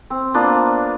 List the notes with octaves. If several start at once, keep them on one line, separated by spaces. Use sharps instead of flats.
C4
A#3 B3 D4 F4